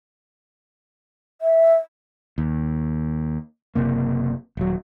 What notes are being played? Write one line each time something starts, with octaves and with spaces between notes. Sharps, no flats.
E5
D#2
F#1 C#2 C3 A#3
D#1 F#3